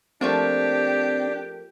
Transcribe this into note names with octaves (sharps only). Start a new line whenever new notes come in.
F3 A3 A#3 C4 D4 G4